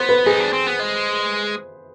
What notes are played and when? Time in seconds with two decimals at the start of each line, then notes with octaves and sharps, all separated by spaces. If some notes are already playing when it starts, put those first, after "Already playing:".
Already playing: B3 C5
0.09 B4
0.26 D#4 G#4
0.40 D4
0.53 C4
0.67 B3
0.79 G#3